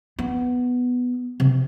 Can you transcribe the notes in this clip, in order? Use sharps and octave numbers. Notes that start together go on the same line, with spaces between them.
B3
C3